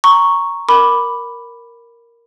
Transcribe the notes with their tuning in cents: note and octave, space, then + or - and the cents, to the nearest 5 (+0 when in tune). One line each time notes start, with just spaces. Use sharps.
A#5 +0 C#6 +0
A#4 +0 B5 +0 D6 +0